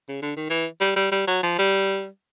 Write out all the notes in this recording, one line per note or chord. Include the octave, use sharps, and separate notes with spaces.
C#3
D3
D#3
E3
G3
G3
G3
F#3
F3
G3